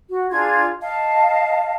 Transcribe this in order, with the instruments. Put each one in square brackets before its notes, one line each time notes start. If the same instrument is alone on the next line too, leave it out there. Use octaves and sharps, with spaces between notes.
[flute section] F#4
D4 F4 G#4 G#6
D#5 F5 A5